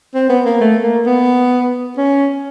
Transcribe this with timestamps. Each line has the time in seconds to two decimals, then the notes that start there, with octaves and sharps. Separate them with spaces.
0.15 C4
0.29 B3
0.45 A#3
0.61 A3
0.83 A#3
1.06 B3
1.97 C#4